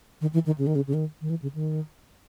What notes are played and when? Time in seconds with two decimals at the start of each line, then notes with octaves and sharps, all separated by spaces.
0.21 D#3
0.34 E3
0.46 D#3
0.58 C#3
0.67 D#3
0.75 C#3
0.87 C#3
0.94 D#3
1.21 D#3
1.30 E3
1.42 C#3
1.55 D#3